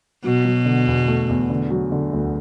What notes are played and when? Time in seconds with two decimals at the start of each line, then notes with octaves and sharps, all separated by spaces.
0.24 B2 F#3
0.45 F#3
0.66 D3
0.87 E2
1.08 A3
1.29 E2
1.50 D3
1.70 F#3
1.92 D3
2.13 D2